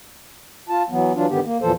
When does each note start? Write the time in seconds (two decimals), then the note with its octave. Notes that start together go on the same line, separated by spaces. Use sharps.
0.69 F4 A5
0.90 E3 F#3 B3
1.15 E3 F#3 D4 F4
1.29 G2 D3 D#3 B3 G4
1.44 A#3
1.61 E2 A#2 E3 F3 A4 C5